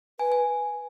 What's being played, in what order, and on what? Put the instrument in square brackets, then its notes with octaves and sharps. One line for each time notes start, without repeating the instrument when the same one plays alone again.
[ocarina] B4 [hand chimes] G#5
[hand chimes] G#5